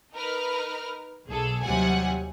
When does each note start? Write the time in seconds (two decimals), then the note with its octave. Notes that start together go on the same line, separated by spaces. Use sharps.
0.13 D#4 A#4 B4 F6
1.27 B1 G#4 A4
1.62 D#2 C3 F#3 G3 F#5 G#5